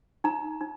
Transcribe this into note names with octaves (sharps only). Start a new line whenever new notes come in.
D#4 A#5
D#4